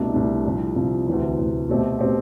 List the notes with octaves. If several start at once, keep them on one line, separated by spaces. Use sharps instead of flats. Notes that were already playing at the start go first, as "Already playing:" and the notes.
Already playing: C2 B2 A3 D4
C2 B2 A3 D4
C2 C3 F3
C2 C3 F3
D2 C3 E3
D2 C3 E3
B2 A3 C4 G4
B2 A3 C4 G4